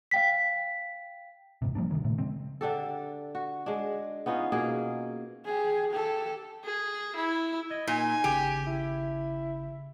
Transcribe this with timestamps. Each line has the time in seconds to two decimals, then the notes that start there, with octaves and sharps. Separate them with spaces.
0.11 F5 G5 B6
1.62 E1 G#2 C3
1.75 F3 G3 A#3 D4
1.91 D2 C3 D#3 F#3
2.05 A#2 C#3 A3
2.18 C#3 G#3 C4
2.61 D3 D4 G4 A4
3.35 F#4
3.66 G#3 D4
4.26 B3 C#4 D#4 F4
4.52 B2 A#3 G#4
5.45 G4 G#4
5.91 G4 A4
6.64 G#4
7.16 E4
7.71 D#5 G#6
7.87 A#2 D#4 G#5
8.24 G#1 C#3 G4 G6
8.67 E4